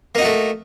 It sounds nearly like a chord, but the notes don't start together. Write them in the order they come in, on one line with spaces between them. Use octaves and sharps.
A#3 D#4 F#4 A3